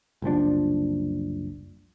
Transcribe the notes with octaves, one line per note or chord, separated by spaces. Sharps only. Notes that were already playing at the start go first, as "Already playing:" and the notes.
F#1 C2 F3 D4